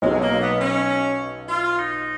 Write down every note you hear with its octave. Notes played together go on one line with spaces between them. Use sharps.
B1 B2 F#3 G#3
A#3
B3
C#4
F4
D#4